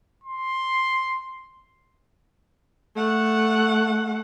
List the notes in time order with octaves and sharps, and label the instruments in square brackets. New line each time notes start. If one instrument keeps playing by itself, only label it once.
[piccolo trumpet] C6
[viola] A3 F#5